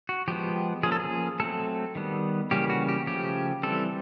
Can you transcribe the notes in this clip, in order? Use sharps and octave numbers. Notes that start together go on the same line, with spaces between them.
F#4
F3 G#3 B3 G4
F3 A#3 C#4 G#4
A4
G#4
F#3 A3 C4 A4
D#3 G3 B3
C#3 E3 G3 A#3 C#4 G4
F#4
G4
C#3 F3 A3 C#4 G4
E3 G3 C4 A4